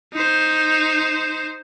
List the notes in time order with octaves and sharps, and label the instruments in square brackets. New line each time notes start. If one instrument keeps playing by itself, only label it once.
[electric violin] D#4 C5